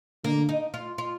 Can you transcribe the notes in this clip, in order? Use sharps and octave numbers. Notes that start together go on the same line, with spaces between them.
D3 A#3
D#4
F4
F4